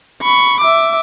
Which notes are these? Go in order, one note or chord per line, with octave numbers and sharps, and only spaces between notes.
B5 C#6
E5 D6